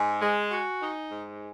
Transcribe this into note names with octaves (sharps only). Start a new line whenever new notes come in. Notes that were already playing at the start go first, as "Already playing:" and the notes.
Already playing: G#2 G#5
G#3
F#4
D#4
G#2